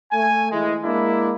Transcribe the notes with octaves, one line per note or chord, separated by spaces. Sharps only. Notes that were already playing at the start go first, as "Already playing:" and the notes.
A3 G#5
E3 G#3
G#3 A#3 D4 E4